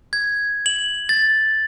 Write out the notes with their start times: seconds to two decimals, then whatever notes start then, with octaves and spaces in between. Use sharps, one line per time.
0.13 G#6
0.66 F#7
1.09 A6